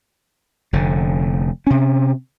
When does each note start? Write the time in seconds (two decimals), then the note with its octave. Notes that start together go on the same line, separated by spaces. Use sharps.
0.73 F1 D3
1.67 C3 C#4